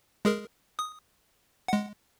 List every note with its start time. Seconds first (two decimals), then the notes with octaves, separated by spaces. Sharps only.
0.25 G#3 G#4 A#4
0.79 D#6
1.68 G#3 F#5